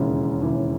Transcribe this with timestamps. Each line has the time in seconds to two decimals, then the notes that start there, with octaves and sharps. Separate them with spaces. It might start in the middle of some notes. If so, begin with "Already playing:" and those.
Already playing: E1 D#2 C#3 E3
0.41 E1 D#2 C#3 E3